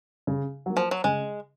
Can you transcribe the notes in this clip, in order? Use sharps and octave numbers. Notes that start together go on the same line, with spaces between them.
C#3
F#3 A#3
F3
F#3
C#3 G#3